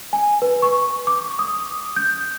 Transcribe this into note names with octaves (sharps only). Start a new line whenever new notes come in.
G#5
B4
C#6
D6
D#6
G6